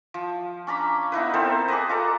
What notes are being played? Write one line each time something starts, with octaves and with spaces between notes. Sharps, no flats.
F3
C#4 D4 A#5 B5
B3 D#4 E4 B4
C4 A4 A#4 C5
G#4 B4 D5 D#5
F4 A4 A#5 D6